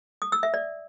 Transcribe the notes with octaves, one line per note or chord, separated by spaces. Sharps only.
D#6
E6
E5
D5